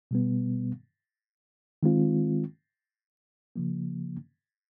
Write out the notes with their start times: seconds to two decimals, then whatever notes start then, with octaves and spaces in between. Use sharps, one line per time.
0.11 B2 G3 B3
1.83 D#3 G#3 C4 F4
3.56 C#3 F3 A#3